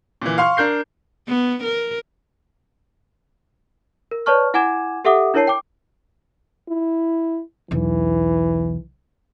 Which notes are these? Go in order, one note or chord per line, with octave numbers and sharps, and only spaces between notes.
A#2 E3
F5 C6 C#6 F6
D4 A#4 G6 C7
B3
A#4
A#4
B4 C#5 D5 A5 C#6 F6
E4 F#5 G#5 D6 G#6 E7
G4 A4 E5 F#5 D6 D#6
D4 E4 A#4 C#5 A5 C7
G5 D6
E4
B1 E2 E3